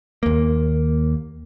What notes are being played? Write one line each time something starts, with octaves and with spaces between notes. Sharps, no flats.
D#2 A#3